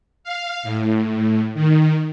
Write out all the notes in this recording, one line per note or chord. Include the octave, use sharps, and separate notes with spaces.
F5
A2
D#3